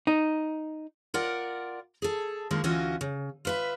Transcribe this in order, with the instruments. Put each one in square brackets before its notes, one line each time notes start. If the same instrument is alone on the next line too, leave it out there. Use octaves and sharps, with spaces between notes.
[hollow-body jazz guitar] D#4
[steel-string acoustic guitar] F4 A#4 D5 F#5
G#4 A4
D3 D#3 F3 G#3 A#3
D2 E3 C#4 F4 F#4 D#5
C#3
F4 B4 E5